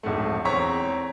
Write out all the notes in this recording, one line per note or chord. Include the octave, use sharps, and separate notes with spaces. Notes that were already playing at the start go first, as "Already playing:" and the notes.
D1 A#1 G#2 A3
E2 C4 C#5 A#5 C#6 B6